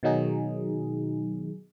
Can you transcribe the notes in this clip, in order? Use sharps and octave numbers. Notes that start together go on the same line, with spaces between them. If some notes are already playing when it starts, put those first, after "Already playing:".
B2 D#3 F#3 D#4 G#4